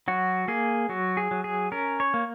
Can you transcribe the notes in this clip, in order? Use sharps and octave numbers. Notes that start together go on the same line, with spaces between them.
F#3 F#4
A#3 G#4
F#3 F#4
G#4
F#3
G#4
C#4 A#4
C#5
A#3